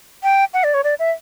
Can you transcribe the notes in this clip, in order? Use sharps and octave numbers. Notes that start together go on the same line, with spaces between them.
G5
F#5
D5
C#5
D5
E5